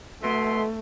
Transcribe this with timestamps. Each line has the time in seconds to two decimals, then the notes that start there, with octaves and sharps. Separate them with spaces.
0.22 B2 A3 E5 C6